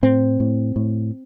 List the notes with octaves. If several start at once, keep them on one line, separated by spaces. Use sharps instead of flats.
A2 C4
A2
A2